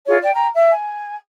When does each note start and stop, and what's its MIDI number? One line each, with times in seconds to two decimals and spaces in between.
0.07 0.17 64
0.07 0.17 65
0.07 0.17 68
0.07 0.17 73
0.21 0.32 74
0.21 0.32 79
0.34 0.46 79
0.34 0.46 82
0.54 0.70 76
0.71 1.15 80